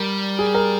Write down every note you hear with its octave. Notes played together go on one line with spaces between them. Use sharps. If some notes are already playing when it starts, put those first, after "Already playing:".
Already playing: G3 A#4
G#4
A#4